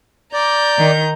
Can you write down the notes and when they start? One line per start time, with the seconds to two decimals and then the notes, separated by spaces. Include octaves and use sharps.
0.33 D5 A#5 G6
0.78 D#3